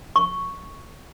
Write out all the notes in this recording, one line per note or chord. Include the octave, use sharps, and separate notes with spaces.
C#6